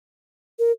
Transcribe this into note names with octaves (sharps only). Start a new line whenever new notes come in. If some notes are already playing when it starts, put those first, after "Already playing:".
A#4